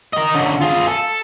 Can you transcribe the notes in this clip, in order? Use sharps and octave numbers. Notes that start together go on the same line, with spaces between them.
A#4 D#5
D3 C#4
F4 G#4
A4